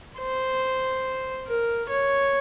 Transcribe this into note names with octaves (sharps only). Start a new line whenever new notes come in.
C5
A#4
C#5